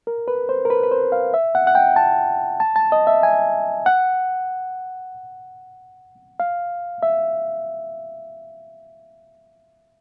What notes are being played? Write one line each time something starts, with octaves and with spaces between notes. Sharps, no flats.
A#4
B4
C5
A#4
B4
B4
C5
F5
E5
F#5
F#5
G5
A5
A5
A5
D#5
E5
G#5
F#5
F5
E5